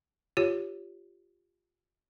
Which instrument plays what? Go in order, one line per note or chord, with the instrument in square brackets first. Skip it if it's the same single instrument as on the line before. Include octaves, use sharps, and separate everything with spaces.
[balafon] F4 G4 C#5